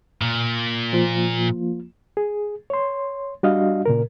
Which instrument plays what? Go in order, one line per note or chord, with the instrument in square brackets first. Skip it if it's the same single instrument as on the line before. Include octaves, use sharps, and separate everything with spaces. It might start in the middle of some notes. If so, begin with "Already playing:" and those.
[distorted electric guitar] A#2
[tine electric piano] F3 A#3 F4
[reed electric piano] G#4
C#5 C6
G3 D4 F#4 D#5 F5
A#2 C#3 A#4